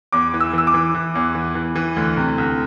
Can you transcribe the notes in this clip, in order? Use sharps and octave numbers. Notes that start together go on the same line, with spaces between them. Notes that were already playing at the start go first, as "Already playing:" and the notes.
E2 D6
E3
E6
E3 E6
D6
E3
E3
E2
E3
E3
E3
D2
C3
D2